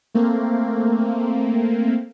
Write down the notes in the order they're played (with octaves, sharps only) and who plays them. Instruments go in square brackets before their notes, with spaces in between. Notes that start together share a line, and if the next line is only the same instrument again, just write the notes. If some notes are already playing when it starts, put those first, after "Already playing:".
[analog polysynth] A3 A#3 C4